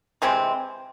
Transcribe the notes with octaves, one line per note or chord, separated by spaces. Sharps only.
C3 E3 G#3 C4